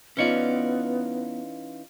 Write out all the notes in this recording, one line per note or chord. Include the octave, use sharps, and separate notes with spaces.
E3 B3 C#4 D#4 F4 C#5 D5